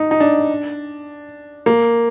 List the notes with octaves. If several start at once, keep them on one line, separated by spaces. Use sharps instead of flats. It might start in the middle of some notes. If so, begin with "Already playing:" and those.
Already playing: D#4
D#4
D4
A#3